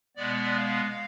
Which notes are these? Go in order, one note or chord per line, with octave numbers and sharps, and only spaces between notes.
B2 G#3 B3 D5
F5